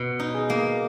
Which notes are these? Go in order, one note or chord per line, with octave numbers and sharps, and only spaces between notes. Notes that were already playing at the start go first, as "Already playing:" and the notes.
Already playing: B2
D#4
G#4
A#3